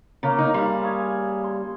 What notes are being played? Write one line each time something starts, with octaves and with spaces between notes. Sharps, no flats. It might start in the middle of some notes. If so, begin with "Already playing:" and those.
C#3 A#3 A#5
D#4
C#3 G3 C6
G#4 C#5 G#5
C6